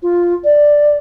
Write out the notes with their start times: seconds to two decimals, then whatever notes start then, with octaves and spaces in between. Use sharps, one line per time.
0.02 F4
0.44 D5